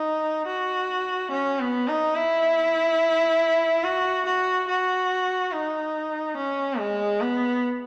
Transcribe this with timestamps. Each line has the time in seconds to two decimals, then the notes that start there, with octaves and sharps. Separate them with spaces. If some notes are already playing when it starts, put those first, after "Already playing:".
Already playing: D#4
0.47 F#4
1.31 C#4
1.59 B3
1.87 D#4
2.15 E4
3.84 F#4
4.26 F#4
4.68 F#4
5.52 D#4
6.37 C#4
6.79 G#3
7.21 B3